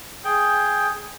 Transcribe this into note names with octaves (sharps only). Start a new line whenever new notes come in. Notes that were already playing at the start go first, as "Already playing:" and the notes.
G#4 G5